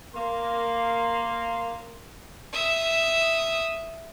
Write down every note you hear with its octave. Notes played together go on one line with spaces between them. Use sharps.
A#3 C6
E5 D#6